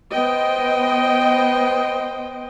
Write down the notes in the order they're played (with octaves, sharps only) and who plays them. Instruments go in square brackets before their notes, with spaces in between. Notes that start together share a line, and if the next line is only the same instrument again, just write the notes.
[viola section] B3 C5 D#5 G5